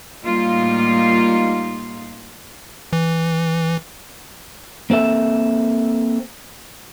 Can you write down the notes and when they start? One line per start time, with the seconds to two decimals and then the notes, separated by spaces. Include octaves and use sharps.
0.22 A2 G3 A#3 D#4 F4
2.93 E3
4.90 A#3 C4 A4 E5